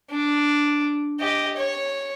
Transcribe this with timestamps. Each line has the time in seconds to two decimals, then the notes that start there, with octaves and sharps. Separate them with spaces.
0.10 D4
1.20 G4 D#5
1.57 C#5